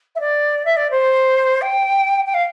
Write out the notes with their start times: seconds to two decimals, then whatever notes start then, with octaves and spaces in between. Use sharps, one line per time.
0.15 E5
0.20 D5
0.65 E5
0.77 D5
0.91 C5
1.62 G5
2.26 G5
2.34 F5